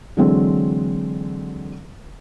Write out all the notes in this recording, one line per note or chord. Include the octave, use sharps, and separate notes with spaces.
D3 E3 F#3 G#3 C4